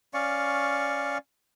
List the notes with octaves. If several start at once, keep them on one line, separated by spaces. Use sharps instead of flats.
C#4 D5 F5 C#6